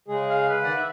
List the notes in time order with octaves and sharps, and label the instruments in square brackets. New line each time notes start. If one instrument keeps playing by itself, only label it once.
[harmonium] C#3 G#3 G#4
[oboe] F5
B4
[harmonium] D#3 D5 F#5
E5